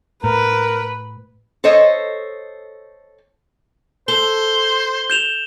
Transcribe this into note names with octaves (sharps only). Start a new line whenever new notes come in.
A2 A#4 B4
A4 C5 C#5 D#5
A4 C5 G7
G6 E7 F7